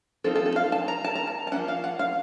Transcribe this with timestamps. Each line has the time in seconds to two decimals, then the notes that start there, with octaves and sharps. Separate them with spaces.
0.24 F3 C4 D#4 A4
0.35 A4
0.46 A4
0.56 F5
0.72 A5
0.88 A#5
1.04 A5
1.15 A#5
1.27 A5
1.47 A5
1.52 F3 A#3 C#4 F#5
1.68 F5
1.84 F#5
1.99 F5